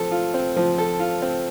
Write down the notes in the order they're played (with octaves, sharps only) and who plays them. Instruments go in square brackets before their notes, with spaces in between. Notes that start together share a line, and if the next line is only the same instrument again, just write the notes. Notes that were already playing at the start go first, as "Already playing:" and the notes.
Already playing: [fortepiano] F3 C4 A4
F4
C4
F3
A4
F4
C4